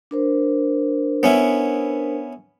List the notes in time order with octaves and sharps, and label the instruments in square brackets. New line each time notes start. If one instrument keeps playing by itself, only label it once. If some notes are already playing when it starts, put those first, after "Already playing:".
[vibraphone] D4 A#4 C5
[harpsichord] B3 C#4 E4